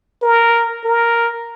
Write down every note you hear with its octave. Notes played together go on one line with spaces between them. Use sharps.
A#4
A#4